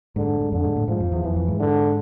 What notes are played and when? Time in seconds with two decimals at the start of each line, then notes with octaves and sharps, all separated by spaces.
0.16 G#2 D3
0.28 G#2
0.40 G#2
0.52 F2 D3
0.64 G#2
0.76 A2
0.88 G#2 F3
1.00 F2
1.12 E2
1.24 F2 E3
1.36 F2
1.48 G#2
1.60 D3